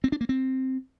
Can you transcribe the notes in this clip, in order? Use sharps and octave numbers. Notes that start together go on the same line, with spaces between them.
C4
D4
A#3
C4